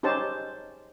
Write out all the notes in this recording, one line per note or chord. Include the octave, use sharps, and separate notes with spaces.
C#4 D#4 G4 C5 A5